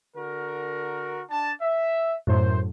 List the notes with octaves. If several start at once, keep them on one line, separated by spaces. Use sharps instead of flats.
D3 F#4 A#4
D4 A5
E5
F#2 A2 C5